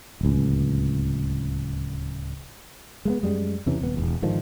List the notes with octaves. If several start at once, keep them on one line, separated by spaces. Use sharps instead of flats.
D1 C#2
G#3 A3 B3
F#2 G3 G#3
E2 C3 E3 C#4
D#1 B3
E1 A1 E2
G#2 D3 D#3 F3